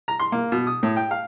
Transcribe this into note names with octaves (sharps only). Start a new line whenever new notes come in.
A#5
C6
A#3
B2
D#6
A2
G5
F5